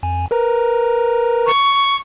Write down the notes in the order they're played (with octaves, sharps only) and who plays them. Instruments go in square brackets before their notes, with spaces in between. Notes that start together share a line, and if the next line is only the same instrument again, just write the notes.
[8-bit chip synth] F2 G#5
A#4 B4 A#5
[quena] C#6